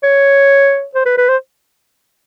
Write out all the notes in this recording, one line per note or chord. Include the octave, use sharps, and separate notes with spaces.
C#5
C5
B4
B4
C5